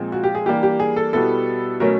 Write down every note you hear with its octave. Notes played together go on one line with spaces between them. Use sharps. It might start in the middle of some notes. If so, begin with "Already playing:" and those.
Already playing: A#2 F3 G#3 C4
F#4
G4
G#4
E3 G3 A#3 D4 G4
G4
G#4
A4
B2 G3 B3 E4 A4
B2 F#3 A3 C#4 A#4